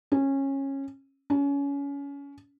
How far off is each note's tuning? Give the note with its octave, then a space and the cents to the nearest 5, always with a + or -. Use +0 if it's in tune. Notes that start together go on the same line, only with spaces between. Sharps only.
C#4 -20
C#4 +25